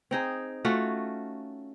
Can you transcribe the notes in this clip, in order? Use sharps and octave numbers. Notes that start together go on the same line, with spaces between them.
C4 D#4 G#4
A3 C#4 F4 F#4